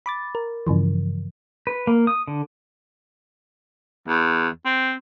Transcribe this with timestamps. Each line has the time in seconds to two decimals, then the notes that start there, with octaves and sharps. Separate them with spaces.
0.06 B5 D6 A6
0.35 A#4
0.67 G2 C#3 E3 F3
1.67 B4
1.87 A#3
2.07 D#6
2.27 D3
4.08 E2
4.66 C4